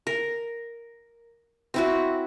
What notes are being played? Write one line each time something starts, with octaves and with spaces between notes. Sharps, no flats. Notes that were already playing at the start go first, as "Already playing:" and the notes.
A#4
C4 E4 F#4